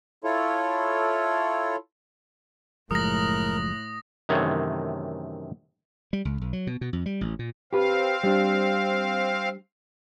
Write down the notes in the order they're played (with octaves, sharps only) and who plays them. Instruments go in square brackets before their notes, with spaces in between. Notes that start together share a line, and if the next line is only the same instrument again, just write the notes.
[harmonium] E4 F4 A4 C#5
[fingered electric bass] F#1 F3 G#3 [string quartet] A2 F#6 [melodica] A#4 [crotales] D#6 A#6
[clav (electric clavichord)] F#2 C3 D#3 E3 A3 C#5
[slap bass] G3
C#2
B1
F#3
B2
B2
F2
G3
A1
A#2
[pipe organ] C4 F5 [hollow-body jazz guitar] G4 B4
[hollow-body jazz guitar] G3 D4